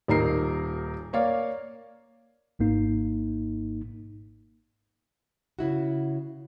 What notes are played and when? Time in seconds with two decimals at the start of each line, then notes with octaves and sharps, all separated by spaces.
0.08 D#1 D#3 A#4 C7
1.13 A#3 C#5 D5 F5
2.59 G#1 G#2 A#3 D#4
5.59 C#3 E4 F#4